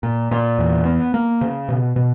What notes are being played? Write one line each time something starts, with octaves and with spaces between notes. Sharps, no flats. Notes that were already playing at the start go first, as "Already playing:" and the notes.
A#2
A#2
E2
B3
A#3
C#3
B2
B2